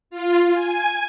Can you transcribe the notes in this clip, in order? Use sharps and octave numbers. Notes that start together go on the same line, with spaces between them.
F4
G#5